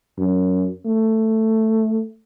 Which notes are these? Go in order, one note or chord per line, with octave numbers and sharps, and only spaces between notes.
F#2
A3